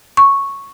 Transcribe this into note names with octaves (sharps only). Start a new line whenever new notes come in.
C#6